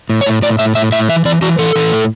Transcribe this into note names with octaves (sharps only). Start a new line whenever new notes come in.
A2
C#5
A2
A2 D5
A2 E5
A2 E5
A2 E5
E3 E5
E3 D5
E3 F#4
E3 A4
E3
A2